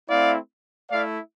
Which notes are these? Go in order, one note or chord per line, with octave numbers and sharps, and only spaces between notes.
A3 C4 E4 D5 F5
A3 E4 D5 F5